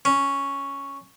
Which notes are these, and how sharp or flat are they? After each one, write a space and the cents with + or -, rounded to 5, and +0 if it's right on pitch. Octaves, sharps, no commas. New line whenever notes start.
C#4 +0